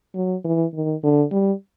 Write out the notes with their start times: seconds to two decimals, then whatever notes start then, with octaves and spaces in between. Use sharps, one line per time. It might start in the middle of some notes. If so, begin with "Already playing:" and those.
0.15 F#3
0.45 E3
0.74 D#3
1.03 D3
1.31 G3